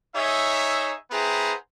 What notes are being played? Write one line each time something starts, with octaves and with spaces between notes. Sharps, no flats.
D#4 G#4 C#5 E5
B3 E4 G#4 C5 G5 A#5